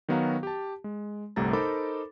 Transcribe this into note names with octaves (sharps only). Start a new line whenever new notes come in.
D#3 F#3 B3 F#4 F5 A#5
G4 A5
G#3
G1 C2 C3 A3 A#5 A6
D#4 A4 A#4 C5 B5 D6